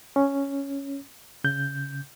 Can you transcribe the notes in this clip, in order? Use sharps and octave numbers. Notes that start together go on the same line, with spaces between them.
C#4
C#3 G6